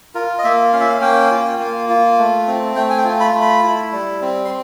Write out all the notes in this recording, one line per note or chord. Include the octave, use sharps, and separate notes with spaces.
F4 A#4
D#5
A#3 E5
C#4 F5
E5
F5
A#3 G5
F4
A#3
F4
A3
C4
A3 G5
G#5
G5
F4
B5
A3
B5
E4
G3
C4
C6